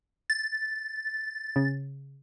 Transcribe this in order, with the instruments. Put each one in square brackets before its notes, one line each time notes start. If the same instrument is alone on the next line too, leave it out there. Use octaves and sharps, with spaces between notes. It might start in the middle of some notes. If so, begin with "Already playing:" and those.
[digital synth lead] A6
[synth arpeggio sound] C#3